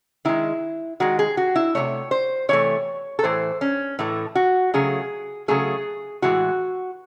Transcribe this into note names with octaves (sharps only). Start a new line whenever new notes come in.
D#3 G#3 E4
D#3 G#3 F#4
G#4
F#4
E4
C3 E3 A3 C#5
C5
C3 E3 A3 C#5
A4
A2 E3 A3 C5
C#4
A2 E3 A3
F#4
C#3 F#3 A3 G#4
C#3 F#3 A3 G#4
A2 E3 G#3 F#4